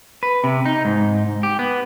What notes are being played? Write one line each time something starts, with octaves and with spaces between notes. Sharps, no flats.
B4
C3
D#4
G#2
G4
B3